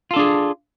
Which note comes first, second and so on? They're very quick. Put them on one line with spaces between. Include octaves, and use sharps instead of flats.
F4 A4 D4 G#4